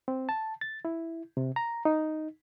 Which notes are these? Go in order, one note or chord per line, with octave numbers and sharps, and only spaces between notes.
C4
A5
A6
E4
C3
A#5
D#4